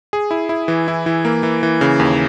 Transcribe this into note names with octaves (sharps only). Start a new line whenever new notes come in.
G#4
E4
E4
E3
E4
E3
A#3
E3
E3
C#3
D#2